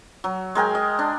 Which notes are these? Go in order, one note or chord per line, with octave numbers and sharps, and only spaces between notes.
F#3
G#3 A#4 G5 G#5
D#5
D4